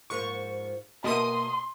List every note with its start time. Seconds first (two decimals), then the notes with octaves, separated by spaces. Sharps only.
0.10 G#2 F3 A#3 C#6
1.04 B2 A#3 A#4 E5 C6 D#6 D#7